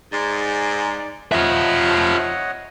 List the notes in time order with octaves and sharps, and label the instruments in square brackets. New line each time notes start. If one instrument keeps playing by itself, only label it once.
[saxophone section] G#2 [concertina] D5
[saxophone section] F3 [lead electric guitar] F4 E5 [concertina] C#5 D#5 F#5